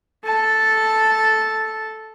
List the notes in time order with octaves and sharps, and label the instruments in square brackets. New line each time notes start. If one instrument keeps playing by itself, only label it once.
[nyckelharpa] A4 A5